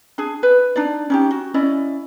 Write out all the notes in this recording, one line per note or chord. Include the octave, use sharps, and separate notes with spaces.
D4 G#4
B4
D4 D#4 D5
C#4 D#4 G4
F#4
C#4 E4 D5 D#5